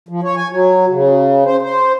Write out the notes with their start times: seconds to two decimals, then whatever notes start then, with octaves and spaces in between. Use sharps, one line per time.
0.09 F3
0.23 C#5
0.36 G#5
0.52 F#3
0.89 C#3
1.45 C5
1.62 C5